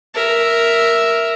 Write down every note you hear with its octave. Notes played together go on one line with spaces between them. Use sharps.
A#4 E5